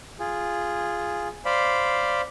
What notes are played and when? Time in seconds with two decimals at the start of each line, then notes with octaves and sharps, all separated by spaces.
0.19 F4 G#4
1.45 C5 D5 F5 B5